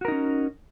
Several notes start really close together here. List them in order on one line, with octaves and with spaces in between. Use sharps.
F#4 A#4 D#4 C#4